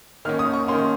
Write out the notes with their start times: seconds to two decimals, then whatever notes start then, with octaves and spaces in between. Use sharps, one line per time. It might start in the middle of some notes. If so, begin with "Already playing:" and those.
0.25 D#3 A#3 C#4 F6
0.39 D#6
0.54 C#6
0.68 D#3 A#3 C#4 C6